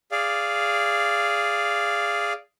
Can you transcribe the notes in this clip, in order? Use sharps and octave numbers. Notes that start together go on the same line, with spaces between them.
G#4 D5 F5